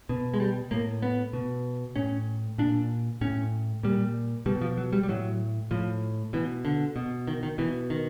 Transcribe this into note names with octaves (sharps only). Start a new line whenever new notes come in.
B2
G#3
G3
A2 A#3
B3
B2
A2 C#4
A#2 D4
A2 C#4
A#2 G3
B2 G3
F3
F#3
G3
G3
A2 F#3
A2 F3
B2 E3
D3
B2
D#3
D#3
B2 E3
D#3